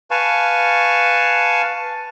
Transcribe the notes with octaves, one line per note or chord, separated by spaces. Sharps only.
B4 F5 G#5 A5 C#6